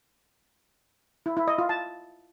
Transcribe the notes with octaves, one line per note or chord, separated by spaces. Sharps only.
E4
E4
D#5
F4
A5